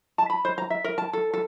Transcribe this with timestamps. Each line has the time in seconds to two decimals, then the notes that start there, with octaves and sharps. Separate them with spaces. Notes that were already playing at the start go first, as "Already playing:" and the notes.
0.18 A5
0.30 B5
0.45 C5
0.58 A#5
0.70 E5
0.84 A#4
0.98 A5
1.13 A4
1.33 A4